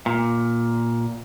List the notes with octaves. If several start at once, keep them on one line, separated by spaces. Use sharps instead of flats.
A#2